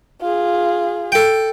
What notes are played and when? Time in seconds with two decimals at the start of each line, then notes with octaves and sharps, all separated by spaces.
0.21 F4 G#4
1.12 A4 G5